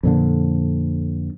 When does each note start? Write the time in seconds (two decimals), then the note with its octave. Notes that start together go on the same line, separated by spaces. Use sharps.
0.03 F2 A#2 D3